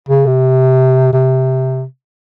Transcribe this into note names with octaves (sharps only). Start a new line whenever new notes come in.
C#3
C3
C3